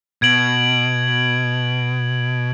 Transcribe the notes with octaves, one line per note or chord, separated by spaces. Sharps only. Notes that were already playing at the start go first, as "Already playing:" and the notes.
B2 G#6 D7 F#7